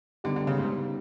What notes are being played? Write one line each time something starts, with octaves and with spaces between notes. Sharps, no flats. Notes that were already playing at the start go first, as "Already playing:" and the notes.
D3 G3 B3 D#4 G4
D3
C#3
G#2